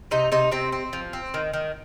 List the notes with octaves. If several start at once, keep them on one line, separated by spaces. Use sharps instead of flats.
C3 D#4
C3 D#4
C3 C4
C4
F3
C4
D#3
D#3